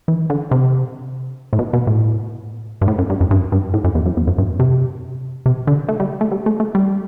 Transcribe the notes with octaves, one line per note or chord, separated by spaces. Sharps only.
E3
D3
C3
A2
B2
B2
A2
G2
A2
F#2
G2
F#2
G2
G2
A2
F#2
E2
F#2
E2
F#2
G2
C3
C3
D3
A3
G3
A3
G3
A3
A3
G3